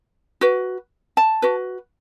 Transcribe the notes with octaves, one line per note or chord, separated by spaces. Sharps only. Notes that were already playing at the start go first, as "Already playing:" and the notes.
F#4 B4
A5
F#4 B4